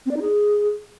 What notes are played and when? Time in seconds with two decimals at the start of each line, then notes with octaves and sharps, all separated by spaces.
0.06 C4
0.11 D5
0.16 D#4
0.22 G#4